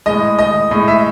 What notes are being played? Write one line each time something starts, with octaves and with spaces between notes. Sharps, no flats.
A2 G#3 D#5
D#5
A2 G#3 D#5
E5